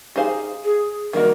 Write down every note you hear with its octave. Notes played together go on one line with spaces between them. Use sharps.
D#4 G4 G#4 C5 F5
G#4
D#3 G3 A#3 D#4 F#4 A#4